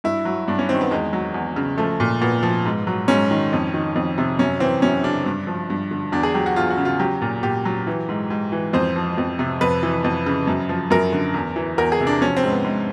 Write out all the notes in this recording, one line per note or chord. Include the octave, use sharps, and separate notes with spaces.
G2 E4
F#3
G2 D4
C#4
D#3 C4
B3
E2 G#3
F#3
E2
C#3
F3 A3
A#2
A#2 B3
F3
G#2
F#3
G#2 C#4
D#3
F2
D#3
F2
C3
F#2 C#4
E3 C4
F#2 C#4
C#3 D4
G2
F3
G2
D3
E2 D4
G#4
F#3 G4
F#4
E2 F4
F#4
C#3
F4
F#3 G4
A#2
A#2 G4
F#3
E3
G#2
G#2
E3
F2 C5
F3
F2
C3
F2 B4
E3
F2
C#3
F#2
F3
F#2 A#4
D3
E2
E3
E2 A#4
G#4
C3
D4
F3 C#4
C4
G#2
B3
G#2